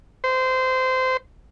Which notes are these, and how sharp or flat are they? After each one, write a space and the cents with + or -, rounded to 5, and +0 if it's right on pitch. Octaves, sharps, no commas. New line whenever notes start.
C5 -20